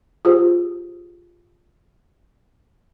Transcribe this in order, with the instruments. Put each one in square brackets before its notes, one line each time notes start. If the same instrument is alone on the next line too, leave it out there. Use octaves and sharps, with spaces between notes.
[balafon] F4 G4 G#4 C5